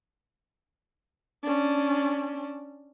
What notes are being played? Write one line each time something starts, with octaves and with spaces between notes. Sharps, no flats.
C#4 D4